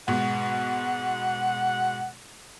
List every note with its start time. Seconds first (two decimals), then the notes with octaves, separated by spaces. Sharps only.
0.08 G#2 B2 F#5